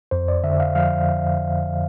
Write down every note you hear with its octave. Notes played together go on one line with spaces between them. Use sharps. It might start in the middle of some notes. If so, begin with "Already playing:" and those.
F2 C5
D5
D3 E5
F5
F3 F5